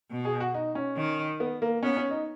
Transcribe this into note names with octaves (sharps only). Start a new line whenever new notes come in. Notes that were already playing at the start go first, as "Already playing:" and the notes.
B2
G#4
F#4
D#4
C#4
D#3
B3
A#3
B3 C#4
C#4
D#4